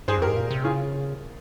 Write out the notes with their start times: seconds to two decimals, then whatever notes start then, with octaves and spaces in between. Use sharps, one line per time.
0.08 G2 G#4 C5
0.18 F2
0.22 G4 A#4
0.27 G#2
0.36 A#2
0.51 C3
0.64 C#3 F4 G#4